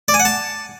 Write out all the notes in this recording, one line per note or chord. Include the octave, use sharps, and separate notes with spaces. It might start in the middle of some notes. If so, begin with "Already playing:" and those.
D5
G#5
F#5
A5